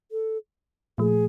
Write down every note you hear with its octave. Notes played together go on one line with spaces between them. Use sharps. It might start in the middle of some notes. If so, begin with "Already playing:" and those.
A4
A#2 F3 A3 G#4